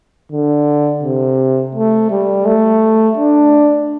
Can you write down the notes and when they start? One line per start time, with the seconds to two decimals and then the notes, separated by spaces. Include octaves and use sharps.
0.32 D3
1.03 C3
1.75 A3
2.10 G3
2.46 A3
3.17 D4